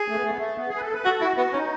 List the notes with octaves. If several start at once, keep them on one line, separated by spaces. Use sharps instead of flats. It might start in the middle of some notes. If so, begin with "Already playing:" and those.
Already playing: G#4
A3
B3
A3
B3
A3
B3
G#4
B4
A4
B4
F#4 A4
E4 F#4
B3 F#4
C#4 D#4